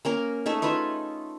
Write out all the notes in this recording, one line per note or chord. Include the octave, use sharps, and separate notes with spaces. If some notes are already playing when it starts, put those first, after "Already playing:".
A#3 C#4 A#4
A3 D#4 G#4 E5
D#4 F4 B4 E5